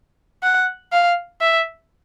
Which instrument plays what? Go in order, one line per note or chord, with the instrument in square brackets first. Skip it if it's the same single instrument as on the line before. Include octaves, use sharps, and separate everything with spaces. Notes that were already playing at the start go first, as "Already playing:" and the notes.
[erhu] F#5
F5
E5